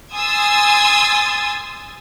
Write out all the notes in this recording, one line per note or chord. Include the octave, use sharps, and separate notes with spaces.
G#5 C6 D#6 E6 G#6 A6